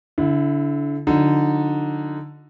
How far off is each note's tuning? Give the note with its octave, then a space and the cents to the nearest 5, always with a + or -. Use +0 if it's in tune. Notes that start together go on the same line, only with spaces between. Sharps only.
D3 -30 E4 +0
D3 +0 F3 +45 D#4 +0